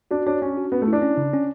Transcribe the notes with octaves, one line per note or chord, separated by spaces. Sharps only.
D4 F#4
D4 C#5
C#4 D4
F#4
B3 C#4
A3
D4 E4
C#4
C#3
C#4